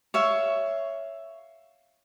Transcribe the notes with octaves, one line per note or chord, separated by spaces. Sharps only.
C#5 E5 F5